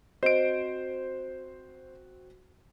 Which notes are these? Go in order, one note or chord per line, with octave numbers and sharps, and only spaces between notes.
C4 F#4 C5 D#5 D7